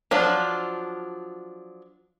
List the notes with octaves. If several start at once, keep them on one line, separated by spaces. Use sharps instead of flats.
F3 F#3 D4 F4